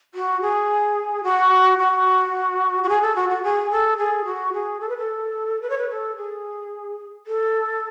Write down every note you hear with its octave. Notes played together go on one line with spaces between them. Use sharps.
F#4
G#4
F#4
F#4
F#4
G#4
A4
F#4
F#4
G#4
A4
G#4
F#4
G#4
A4
B4
A4
B4
C#5
B4
A4
G#4
A4